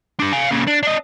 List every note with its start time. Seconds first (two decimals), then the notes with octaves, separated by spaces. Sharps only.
0.20 D4 G4
0.33 F5 G#5
0.51 A#2 C#3
0.68 D4
0.83 D4 D#5